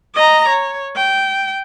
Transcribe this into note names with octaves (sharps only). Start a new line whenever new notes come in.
D#5 A#5
C#5
G5